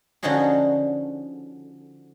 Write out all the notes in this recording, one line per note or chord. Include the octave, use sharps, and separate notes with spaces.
D3 F3 C#4 D#4 F#4 G#4